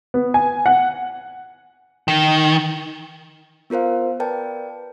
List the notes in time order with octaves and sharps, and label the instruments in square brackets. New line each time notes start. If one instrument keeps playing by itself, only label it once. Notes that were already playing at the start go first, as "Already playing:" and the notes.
[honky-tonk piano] B3
G#5
F#5
[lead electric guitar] D#3
[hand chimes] B3 F4 A#4 C5 F5
A#4 B4 D5 G5 A5